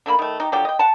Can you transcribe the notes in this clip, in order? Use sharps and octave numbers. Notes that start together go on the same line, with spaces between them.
D3 A3 A#3 B5
D#3 A3
D#4 G4
D3 F3 F#3 G4
D#5 G5
F#5 A5